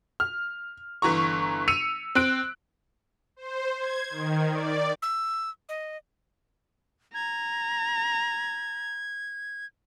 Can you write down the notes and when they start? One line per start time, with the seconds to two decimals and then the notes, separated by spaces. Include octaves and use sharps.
0.20 F6
1.02 G1 E3 A#5 C#6
1.68 E6 C#7 D#7 F7
2.15 C4 F#6 D7
3.36 C5
3.79 G#6
4.10 D#3
4.51 D5
5.02 E6
5.69 D#5
7.14 A#5 G#6